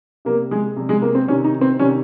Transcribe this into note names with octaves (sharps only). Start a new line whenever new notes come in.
C3 G3 A#3
G#3
C3 G3
G#3
A#3
C4
C3 D#3 G3 C#4
D#4
C4
C3 D#3 G3 C#4